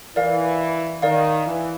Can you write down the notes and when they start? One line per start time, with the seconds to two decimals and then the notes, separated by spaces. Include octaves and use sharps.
0.16 E3 A#4 D5 F5
1.02 D#3 A#4 D5 F5
1.46 E3